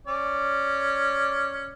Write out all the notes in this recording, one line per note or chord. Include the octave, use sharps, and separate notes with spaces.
C#4 D5